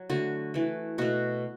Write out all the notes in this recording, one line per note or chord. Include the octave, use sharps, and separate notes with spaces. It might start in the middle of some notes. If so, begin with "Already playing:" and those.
Already playing: F#3
D3 A3 F#4
E3 A3
B2 A3 F#4